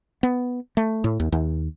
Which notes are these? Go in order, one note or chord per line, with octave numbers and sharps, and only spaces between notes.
B3
A3
A2
D#2
D#2